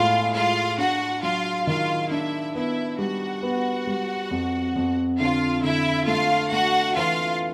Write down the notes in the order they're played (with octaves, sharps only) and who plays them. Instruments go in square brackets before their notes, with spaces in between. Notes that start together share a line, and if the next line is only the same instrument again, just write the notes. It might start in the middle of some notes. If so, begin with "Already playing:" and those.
Already playing: [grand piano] A2 G#3 [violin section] F4 F5
[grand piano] G#3 [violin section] F4 F5
[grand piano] D4 [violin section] F#4 F#5
[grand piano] F#3 [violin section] F4 F5
[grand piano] D#3 [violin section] F4 F5
[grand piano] D4 [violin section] E4 E5
[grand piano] B3 [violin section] E4 E5
[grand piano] G3 [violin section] F#4 F#5
[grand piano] B3
G3
F2
F2
[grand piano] D3 [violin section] F4 F5
[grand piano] D3 [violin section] E4 E5
[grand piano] A3 [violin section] F4 F5
[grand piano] A3 [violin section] F#4 F#5
[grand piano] E3 [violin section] F4 F5